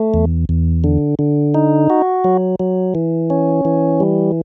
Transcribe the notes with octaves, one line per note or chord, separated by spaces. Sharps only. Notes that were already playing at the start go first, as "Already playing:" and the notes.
Already playing: A3
E2
E2
D3
D3
D#4
F#4
F#3
F#3
E3
C#4
E3
G3